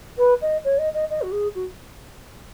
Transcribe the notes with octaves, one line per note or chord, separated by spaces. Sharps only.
B4
D#5
C#5
D#5
D#5
D#5
F#4
G#4
F#4